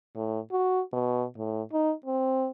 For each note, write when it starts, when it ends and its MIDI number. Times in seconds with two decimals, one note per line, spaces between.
0.15 0.39 45
0.51 0.81 66
0.93 1.25 47
1.37 1.62 45
1.72 1.93 63
2.06 2.49 60